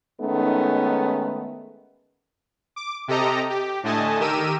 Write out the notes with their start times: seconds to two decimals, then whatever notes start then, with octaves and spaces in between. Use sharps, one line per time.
0.20 D#3 G#3 A3 B3 C#4 D#4
2.76 D6
3.08 C3 G4 A4 D#5 A#5
3.50 G4
3.83 A2 D3 A3 D#5 G#5 A5
4.20 D#3 G4 A#4 E6 D#7